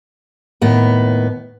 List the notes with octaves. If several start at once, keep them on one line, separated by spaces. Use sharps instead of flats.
D#2 A2 B3